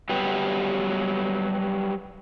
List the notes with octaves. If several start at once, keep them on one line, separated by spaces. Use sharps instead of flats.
F#3 G3 B3 G4 B4